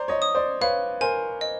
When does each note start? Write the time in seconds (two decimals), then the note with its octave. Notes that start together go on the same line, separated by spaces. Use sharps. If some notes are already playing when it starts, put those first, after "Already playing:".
Already playing: C5 D5 A#5
0.08 C#5 D#5
0.22 D#6
0.35 C5 D5
0.61 B4 C#5 F5
1.01 A#4 C5 G#5
1.41 D#5